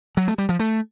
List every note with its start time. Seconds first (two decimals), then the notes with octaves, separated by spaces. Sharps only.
0.17 F#3
0.28 A3
0.38 G3
0.49 F3
0.59 A3